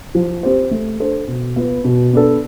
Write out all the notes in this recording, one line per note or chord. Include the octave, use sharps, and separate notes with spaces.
F3
C4 G4 C5
A3
D4 A4 C5
B2
B3 F4 B4
B2
B3 D4 A4